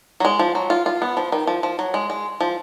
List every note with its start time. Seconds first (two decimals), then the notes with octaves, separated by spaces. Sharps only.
0.20 F#3
0.25 G#3
0.39 F3
0.55 F#3
0.70 F4
0.86 F4
1.02 B3
1.17 F3
1.32 D#3
1.47 F3
1.63 F3
1.79 F#3
1.94 G#3
2.10 G#3
2.41 F3